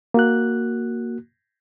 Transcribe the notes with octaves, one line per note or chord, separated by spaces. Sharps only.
A#3 F#4 F#6